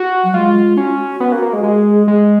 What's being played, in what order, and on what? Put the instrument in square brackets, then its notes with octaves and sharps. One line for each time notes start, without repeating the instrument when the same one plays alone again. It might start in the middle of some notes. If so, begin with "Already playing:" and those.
Already playing: [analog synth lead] F#4
[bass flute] F#3
[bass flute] G#3 [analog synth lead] F4
[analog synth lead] C#4 [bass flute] F#4
[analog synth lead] B3
A#3
A#3
G#3
[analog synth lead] G#3 [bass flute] G#4
[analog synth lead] G#3 [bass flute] G#4